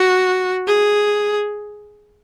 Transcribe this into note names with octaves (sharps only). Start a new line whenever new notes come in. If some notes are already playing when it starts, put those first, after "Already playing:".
Already playing: F#4
G#4